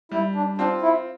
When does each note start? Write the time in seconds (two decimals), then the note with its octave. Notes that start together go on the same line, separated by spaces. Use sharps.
0.11 G3 E4
0.35 D4
0.58 C4 D4 F4
0.82 E4